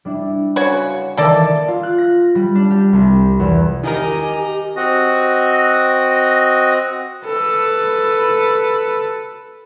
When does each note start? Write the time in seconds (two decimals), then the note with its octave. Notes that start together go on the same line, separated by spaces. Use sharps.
0.05 G3 D4 E4
0.56 C#3 F#4 C#5
1.18 D#3 E3 A#3 A4 D5
1.68 F4
1.83 F#6
1.98 A#6
2.35 G3
2.55 D4
2.71 G4
2.93 C2
3.40 E2
3.83 D#3 D#4 G4 A#4 D#5 G#5 A#5
4.76 C4 F#4 D#5
7.25 A4 B4